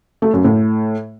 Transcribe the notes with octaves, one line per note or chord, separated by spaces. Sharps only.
A3
F#2
A2